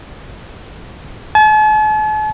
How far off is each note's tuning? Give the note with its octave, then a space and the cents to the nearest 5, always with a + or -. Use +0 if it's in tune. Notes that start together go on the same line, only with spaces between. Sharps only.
A5 -45